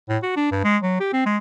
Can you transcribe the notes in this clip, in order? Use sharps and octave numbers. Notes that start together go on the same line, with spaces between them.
A2
F#4
D4
G2
G#3
F#3
G4
C4
G#3